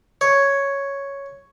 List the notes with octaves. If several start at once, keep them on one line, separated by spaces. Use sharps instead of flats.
C#5